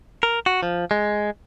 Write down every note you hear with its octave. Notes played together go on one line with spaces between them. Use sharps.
A#4
F#4
F3
G#3